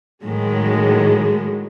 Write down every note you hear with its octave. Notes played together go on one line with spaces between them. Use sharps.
A2 D#3 F#3 G#3